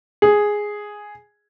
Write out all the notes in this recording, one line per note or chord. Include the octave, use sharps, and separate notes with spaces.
G#4